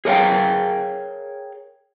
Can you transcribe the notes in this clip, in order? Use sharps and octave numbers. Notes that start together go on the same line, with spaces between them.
G#4 A#4 C#5 D#5 F5 G5